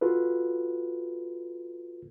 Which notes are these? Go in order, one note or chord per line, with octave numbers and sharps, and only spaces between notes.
F4 F#4 A4 B4